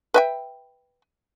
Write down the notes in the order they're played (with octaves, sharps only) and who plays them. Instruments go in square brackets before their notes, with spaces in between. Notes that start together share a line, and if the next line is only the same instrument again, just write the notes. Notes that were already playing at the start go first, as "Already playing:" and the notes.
[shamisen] B4 E5 G5